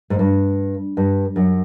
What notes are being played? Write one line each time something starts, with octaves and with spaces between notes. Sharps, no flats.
G#2
G2
G2
F#2